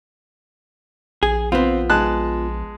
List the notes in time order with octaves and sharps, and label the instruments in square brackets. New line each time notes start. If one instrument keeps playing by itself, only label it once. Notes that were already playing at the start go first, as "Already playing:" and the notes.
[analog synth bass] A#1 [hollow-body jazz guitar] G#4
[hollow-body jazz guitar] B3 F4 [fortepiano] C4
[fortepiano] G#3 A5 F#6